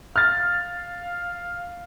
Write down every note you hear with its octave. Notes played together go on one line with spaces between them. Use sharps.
F5 F6 A6